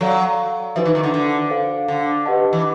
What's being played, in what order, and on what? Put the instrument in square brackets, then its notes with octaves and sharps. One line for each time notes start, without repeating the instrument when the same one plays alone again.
[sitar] F#3 [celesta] A4 D5 F5
[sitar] F3 [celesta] D#4 F#4 B4 E5
[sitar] E3
D#3
D3
D3
[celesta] A4 C5 F5
[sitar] D3
[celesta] G4 B4 D#5 F#5 A5
[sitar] E3